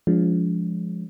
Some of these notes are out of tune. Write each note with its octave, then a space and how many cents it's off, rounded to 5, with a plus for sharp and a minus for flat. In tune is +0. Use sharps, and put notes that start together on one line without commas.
F3 +0 G#3 -5 D4 -45